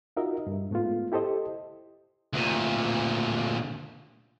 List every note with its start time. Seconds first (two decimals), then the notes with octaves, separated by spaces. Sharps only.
0.17 D#4 F4 F#4 A#4 D#5 E5
0.47 G2
0.71 G#2 A3 B3 F4
1.12 E4 G4 A4 C5 D#5
2.33 D2 A#2